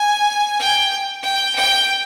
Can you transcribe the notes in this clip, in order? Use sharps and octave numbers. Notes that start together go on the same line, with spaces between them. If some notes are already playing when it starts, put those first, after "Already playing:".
Already playing: G#5
G5
G5
G5